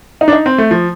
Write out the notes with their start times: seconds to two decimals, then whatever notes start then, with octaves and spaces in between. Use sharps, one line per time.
0.21 D#4
0.28 D4
0.33 D#4
0.46 C4
0.58 A3
0.71 F3